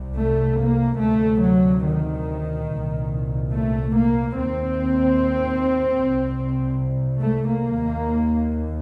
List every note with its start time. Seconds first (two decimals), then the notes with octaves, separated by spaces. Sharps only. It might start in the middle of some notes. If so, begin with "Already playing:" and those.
Already playing: C2 C3
0.14 A3
0.57 A#3
0.98 D2 C3 A3
1.41 F#3
1.84 D#3
2.68 C2 A#2
3.52 A3
3.95 A#3
4.37 D#2 C4
6.06 C2 C3
7.19 A3
7.48 A#3
7.76 D#2